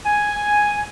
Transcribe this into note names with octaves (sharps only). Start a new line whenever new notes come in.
G#5